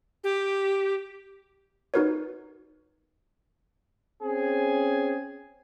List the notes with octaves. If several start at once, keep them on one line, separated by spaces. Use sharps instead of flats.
G4
D#4 F#4 A#4 B4 C#5
C4 C#4 G#4 G#5